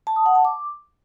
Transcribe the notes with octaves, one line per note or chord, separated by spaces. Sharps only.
A5
D#6
F#5
A5
D6